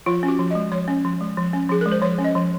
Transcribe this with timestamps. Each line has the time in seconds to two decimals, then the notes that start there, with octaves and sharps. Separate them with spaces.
0.06 F3 F4
0.23 C#4
0.28 F#4
0.39 F3
0.51 G#3 D#5
0.72 F3 C#5
0.88 C#4
1.04 F3
1.21 G#3
1.37 F3
1.53 C#4
1.69 F3 G#4
1.81 G#3 A#4
1.92 C5
2.02 F3 C#5
2.19 C#4
2.24 D#5
2.35 F3